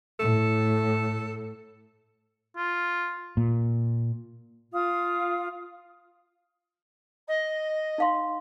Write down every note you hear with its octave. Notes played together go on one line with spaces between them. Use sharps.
A2 A4
F4
A#2
F4 F5 D#6
D#5
D#4 F5 C6